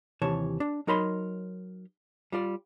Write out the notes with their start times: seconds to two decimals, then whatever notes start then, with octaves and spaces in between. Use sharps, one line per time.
0.22 D#2 C3 E3 C#5 A5
0.60 D4
0.87 F#3 D#4 A#4 C#5 B5 C6
2.32 G3 F4 D5